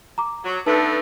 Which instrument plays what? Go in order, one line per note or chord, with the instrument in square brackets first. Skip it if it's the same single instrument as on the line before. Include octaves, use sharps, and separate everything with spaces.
[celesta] A#5 D6
[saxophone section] F#3
[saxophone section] D3 A3 B3 [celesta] D#4 B4 A5